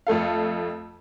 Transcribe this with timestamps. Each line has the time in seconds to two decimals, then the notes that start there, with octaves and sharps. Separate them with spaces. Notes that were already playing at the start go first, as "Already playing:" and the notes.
0.07 F2 A3 A4 F5